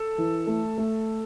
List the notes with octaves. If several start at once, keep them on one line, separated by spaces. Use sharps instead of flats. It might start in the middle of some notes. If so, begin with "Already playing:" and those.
Already playing: A4
E3
A3
A3